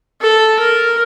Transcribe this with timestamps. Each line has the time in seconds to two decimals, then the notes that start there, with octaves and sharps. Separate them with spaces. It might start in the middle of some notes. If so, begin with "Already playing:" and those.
0.21 A4
0.60 A#4